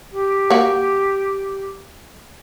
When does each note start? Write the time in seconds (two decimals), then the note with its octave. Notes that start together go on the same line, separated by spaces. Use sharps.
0.11 G4
0.50 A#3 F#4